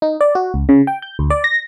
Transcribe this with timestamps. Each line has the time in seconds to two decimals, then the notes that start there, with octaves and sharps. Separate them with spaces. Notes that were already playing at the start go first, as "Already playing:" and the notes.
0.02 D#4
0.21 D5
0.35 F#4
0.54 C#2
0.69 C#3
0.87 G5
1.02 G6
1.19 D2
1.30 D5
1.44 A#6